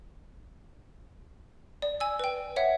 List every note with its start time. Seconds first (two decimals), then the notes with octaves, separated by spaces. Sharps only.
1.82 D5
2.00 G#5 E6
2.19 B4 G5
2.56 C#5 E5 F#5